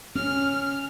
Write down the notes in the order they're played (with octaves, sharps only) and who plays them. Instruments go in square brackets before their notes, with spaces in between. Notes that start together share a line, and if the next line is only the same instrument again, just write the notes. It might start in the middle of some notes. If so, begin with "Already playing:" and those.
[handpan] C#4 [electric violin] F6